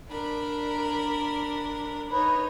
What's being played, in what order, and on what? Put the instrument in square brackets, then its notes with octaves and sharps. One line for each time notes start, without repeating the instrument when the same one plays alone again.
[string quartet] D4 A#4 B5
[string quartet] D#4 C#5 [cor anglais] B4